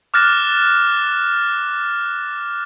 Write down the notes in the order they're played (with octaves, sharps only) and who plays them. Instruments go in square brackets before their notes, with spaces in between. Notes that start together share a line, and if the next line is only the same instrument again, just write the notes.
[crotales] D6 F6 F#6 A6 A#6 E7